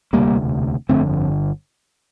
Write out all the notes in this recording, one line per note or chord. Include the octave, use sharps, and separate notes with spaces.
E1 D2 C3 G3 A#3
G1 F2 D3 A3 C4